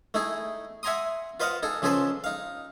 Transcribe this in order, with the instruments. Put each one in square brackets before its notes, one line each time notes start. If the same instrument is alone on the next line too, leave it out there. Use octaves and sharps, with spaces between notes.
[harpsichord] A3 D#4 E4 G#4
E5 F#5 G#5 A#5 C6 D#6
F4 B4 C5 D#5 F5 F#5
D#4 G#4 A4
C#3 F3 G#4 A4 B4 C5
D#4 F5